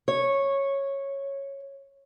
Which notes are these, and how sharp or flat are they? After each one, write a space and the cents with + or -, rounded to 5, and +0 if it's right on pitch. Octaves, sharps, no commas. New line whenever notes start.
C#5 -10